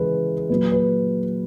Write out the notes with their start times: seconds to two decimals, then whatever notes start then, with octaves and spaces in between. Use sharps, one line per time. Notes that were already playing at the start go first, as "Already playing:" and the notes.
Already playing: C#3 E3 G#3 G#4 B4
0.50 A#2 F#3 B4
0.72 B4